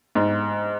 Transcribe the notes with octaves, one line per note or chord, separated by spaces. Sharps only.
G#2